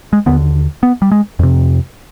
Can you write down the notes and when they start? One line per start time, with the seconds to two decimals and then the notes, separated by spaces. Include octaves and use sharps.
0.13 G#3
0.26 D#2 D3 B3
0.83 B3
1.02 G3
1.12 G#3
1.39 F2 C3